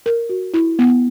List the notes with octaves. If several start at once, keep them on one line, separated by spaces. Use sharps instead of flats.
A#4
F#4
E4
B3